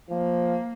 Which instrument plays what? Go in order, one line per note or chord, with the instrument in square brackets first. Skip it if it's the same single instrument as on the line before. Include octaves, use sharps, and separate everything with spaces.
[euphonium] F3 [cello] A#3